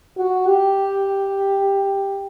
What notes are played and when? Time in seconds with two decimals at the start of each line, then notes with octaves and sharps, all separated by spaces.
0.18 F#4
0.47 G4